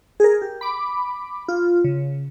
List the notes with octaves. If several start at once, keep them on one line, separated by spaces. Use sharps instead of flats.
G#4 A#4
G4
B5 D6
F4
C#3